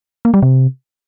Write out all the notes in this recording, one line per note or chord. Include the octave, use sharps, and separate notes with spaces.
A#3
G3
C3